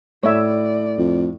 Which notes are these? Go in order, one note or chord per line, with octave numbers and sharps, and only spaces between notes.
A2 C#5 D5 E5
F2